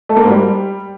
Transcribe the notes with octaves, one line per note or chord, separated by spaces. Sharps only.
A3
A#3
G#2
G3